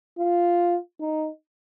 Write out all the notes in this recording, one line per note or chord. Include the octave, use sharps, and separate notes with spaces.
F4
D#4